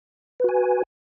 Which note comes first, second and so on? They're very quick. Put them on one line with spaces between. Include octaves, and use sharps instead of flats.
B4 F#4 G#5